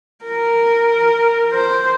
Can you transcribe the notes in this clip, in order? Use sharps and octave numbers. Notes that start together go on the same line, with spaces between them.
A#4
C5